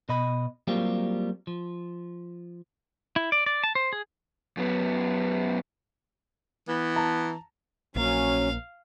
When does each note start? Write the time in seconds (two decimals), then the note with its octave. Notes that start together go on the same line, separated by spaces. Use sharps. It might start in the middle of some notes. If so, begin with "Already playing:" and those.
0.09 B2 D#5 B5
0.67 F#3 G3 A#3 C4 F4 G4
1.47 F3
3.16 E4
3.32 D5
3.46 D5
3.64 A5
3.75 C5
3.93 G#4
4.57 F#2 B3
6.68 E3 B3
6.96 A5 A#5
7.96 A#1 F#3 A#3 C#4 F5